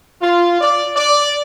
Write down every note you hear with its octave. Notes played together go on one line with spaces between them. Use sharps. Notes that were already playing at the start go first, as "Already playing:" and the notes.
F4
D5
D5